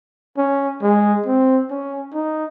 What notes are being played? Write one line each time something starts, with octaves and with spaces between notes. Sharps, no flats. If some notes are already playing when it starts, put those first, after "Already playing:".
C#4
G#3
C4
C#4
D#4